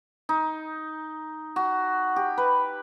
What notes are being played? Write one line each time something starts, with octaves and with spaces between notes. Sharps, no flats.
D#4
F#4
G4
B4